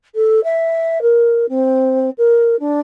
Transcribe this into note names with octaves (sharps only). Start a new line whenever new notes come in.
A4
E5
A#4
C4
A#4
D4